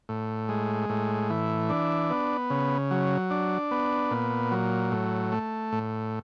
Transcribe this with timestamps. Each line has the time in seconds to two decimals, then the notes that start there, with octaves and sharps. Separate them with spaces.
0.09 A2
0.49 G#3
0.89 A2
1.30 E3
1.70 D4
2.10 B3
2.50 C#3
2.91 F#3
3.30 D4
3.71 B3
4.11 A#2
4.51 F#3
4.92 A2
5.32 A3
5.72 A2